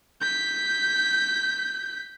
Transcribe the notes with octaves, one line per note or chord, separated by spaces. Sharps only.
G6 B6